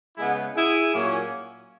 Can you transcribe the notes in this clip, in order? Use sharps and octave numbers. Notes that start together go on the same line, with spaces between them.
C#3 G#3 B3 E4 G#4
E4 G#4
A#2 F#3 A#3 C#4